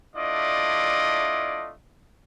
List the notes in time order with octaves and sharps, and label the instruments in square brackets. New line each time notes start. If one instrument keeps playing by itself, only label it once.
[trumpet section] A3 D4 E4 F4 D5 D#5